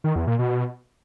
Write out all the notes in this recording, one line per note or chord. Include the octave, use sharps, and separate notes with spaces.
D#3
E2
A#2
B2